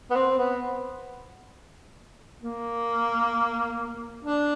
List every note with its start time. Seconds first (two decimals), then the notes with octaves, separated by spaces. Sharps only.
0.10 B3
0.15 C4
0.38 B3
2.43 A#3
4.24 D4